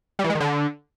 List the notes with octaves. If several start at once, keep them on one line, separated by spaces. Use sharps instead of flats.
G3
E3
G#3
D#3
D3